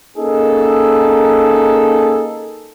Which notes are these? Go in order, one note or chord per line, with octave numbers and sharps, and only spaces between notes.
A#3 C#4 D#4 G#4 A4